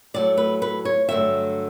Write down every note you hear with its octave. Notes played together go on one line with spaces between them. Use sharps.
A2 F#3 A3 D5
B4
B4
C#5
G2 D3 F#3 A3 E5